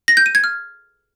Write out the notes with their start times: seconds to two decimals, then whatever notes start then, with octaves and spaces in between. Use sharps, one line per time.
0.08 A#6
0.17 G6
0.26 D#7
0.35 G#6
0.44 F6